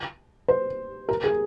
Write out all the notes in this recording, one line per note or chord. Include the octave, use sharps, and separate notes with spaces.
C5
A#4
G#4